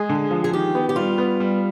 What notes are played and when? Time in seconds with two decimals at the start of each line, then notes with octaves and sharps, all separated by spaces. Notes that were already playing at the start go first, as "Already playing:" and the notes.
Already playing: G#3 G#4
0.09 D3
0.31 F3
0.44 G#4
0.53 D#3 G4
0.75 B3
0.89 G4
0.96 G3 F4
1.18 B3
1.40 G3